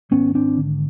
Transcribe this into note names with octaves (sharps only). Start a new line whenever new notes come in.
G#1 B3 C#4
C4 D4
D3